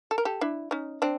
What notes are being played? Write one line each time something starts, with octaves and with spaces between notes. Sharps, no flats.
A4
A#4
G4 A4
D4 E4
C#4 D#4
C4 D4